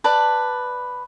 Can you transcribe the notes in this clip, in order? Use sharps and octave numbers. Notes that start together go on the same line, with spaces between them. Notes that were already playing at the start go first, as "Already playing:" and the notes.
B4 D5 A5